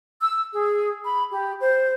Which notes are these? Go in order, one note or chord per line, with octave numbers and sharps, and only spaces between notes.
E6
G#4
B5
G4
C5